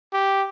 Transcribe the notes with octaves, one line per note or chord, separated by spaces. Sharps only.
G4